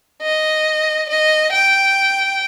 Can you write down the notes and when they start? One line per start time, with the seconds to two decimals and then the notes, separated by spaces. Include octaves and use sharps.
0.22 D#5
1.09 D#5
1.52 G5